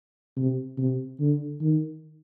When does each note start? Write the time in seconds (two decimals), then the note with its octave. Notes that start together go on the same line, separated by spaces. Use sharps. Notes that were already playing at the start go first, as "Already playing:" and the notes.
0.37 C3
0.78 C3
1.20 D3
1.61 D#3